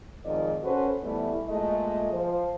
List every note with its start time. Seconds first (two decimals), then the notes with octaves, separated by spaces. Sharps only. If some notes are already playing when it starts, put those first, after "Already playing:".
0.25 G#2 D#3 F3 C4 D5 D#5
0.63 C#4 F#4 A4 B4 C5
1.03 E3 G3 A3 B3 E4
1.48 A#2 G#3 A3 D#5
2.12 F3 C5